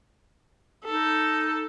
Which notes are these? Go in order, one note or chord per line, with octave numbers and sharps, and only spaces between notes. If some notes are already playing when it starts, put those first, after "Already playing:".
D#4 A4